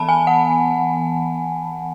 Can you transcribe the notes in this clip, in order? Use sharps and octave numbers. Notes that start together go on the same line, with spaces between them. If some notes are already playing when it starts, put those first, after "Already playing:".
Already playing: E3 B3 A5 B5
G#5
F#5